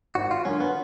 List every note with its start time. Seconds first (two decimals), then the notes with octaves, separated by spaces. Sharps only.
0.15 G#1 F#4
0.31 F4
0.45 F#2 D3 C#4
0.60 B3